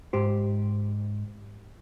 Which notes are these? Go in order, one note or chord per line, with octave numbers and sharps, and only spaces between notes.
G#2 G4 C5